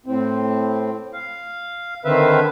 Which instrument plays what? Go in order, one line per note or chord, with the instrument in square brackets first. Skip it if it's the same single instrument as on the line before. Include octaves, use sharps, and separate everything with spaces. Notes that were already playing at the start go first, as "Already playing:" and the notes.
[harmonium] A2 C4
F5
D3 D#3 C4 B4 E5 F5